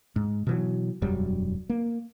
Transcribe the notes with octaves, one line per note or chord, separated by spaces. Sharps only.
G#2
B2 E3 F#3
E1 F#2 F#3 G3
A#3